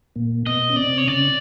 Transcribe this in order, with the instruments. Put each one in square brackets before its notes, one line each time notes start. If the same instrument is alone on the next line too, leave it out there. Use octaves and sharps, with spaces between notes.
[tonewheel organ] A#2 A#3
[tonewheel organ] B2 B3 [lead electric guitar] D#5
[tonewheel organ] C#4
[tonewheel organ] C3 C4 [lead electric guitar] D5
[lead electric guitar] C#5
[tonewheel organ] C#3 C#4 [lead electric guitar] D5